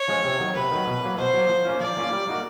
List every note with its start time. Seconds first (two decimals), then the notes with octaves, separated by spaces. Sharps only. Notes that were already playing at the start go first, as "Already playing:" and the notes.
Already playing: C#5
0.08 F3 G#3 C#4
0.24 C3
0.40 D#3 F#3
0.55 C3 B4
0.71 D#3 F#3
0.87 B2
1.03 F#3 A#3
1.18 B2 C5
1.34 F#3 A#3
1.49 F3
1.65 A#3 C#4 F4
1.80 F3 D5
1.97 A#3 C#4 F4
2.12 G3
2.27 A#3 D#4 F#4 A#4